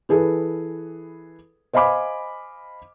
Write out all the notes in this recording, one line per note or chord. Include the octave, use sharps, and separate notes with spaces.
E3 G#4 A4 B4
C5 D#5 F5 G#5 B5 D6